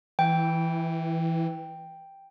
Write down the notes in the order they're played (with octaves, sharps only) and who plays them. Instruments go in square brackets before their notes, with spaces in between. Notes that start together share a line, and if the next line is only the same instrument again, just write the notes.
[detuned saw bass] E3 [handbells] G5